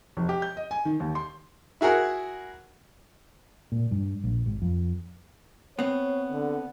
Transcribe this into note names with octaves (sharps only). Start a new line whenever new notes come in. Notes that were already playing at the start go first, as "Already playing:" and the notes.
F1
G4
G6
D#5
G#5
D#3
D#2
C6
E4 F#4 G#4 A#4 F#5
A#2
G2
A#1
G#1
F2
B3 C4 C#5
D3